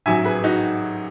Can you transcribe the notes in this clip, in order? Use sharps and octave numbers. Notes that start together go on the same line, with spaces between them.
A1 G#2 F#3 E5 G#5
G#4 B4
D#4 F#4